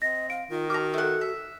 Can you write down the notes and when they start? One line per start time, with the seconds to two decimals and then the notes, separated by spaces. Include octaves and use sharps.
0.02 C4 D#5 A#6
0.30 F5 D7
0.50 D#3 F4
0.70 F#4 A#5 D6 F6
0.94 A3 F#5
1.21 E5